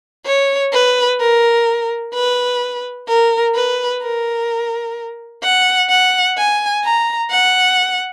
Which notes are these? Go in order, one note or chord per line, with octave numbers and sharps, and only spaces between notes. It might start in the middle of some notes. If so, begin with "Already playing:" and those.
C#5
B4
A#4
B4
A#4
B4
A#4
F#5
F#5
G#5
A#5
F#5